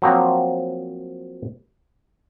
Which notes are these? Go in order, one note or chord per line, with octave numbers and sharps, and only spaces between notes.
F3 F#3 A#3 C4 C#5